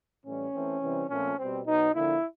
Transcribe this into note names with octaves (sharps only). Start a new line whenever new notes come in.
A2 E3 G3 C#4
E3 A3 C4
C3 E3 G3 C4
A#2 F3 A3 C4 C#4
B2 G3 C4
B2 F#3 B3 D#4
D3 F3 A#3 E4